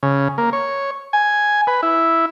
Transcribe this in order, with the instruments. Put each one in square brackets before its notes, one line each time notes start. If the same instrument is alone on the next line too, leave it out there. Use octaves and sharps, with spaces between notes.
[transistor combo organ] C#3
A#3
C#5
G#5
B4
E4